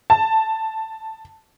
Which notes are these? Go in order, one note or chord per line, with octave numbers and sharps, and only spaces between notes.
A5